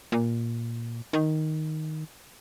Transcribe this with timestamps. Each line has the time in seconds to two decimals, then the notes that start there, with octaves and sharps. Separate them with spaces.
0.12 A#2
1.13 D#3